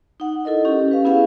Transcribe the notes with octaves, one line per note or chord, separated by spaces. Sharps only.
D#4 F#5
E4 A4 A#4 D#5
C#4 G4
B4 F5
B3 E4 G#4 F5 F#5